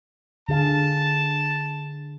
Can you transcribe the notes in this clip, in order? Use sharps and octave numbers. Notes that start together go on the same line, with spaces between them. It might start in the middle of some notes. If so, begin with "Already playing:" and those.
D3 G#4 F5 A5